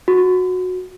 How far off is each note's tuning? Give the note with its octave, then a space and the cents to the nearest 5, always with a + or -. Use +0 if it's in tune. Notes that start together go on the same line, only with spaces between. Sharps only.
F#4 -15